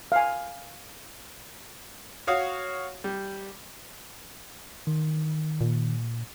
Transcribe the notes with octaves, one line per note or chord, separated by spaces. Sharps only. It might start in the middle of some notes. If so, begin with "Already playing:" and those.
F5 G#5
F#4 C#5 F5 D#6
G3
D#3
A#2